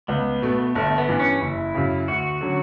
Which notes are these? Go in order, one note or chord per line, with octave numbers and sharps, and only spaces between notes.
C#2 B3
B2 A3
G1 A3
B3
G2 E3
C#4
F#1 E4
F#2 C#3
D2 F#4
D3 F#3 C#4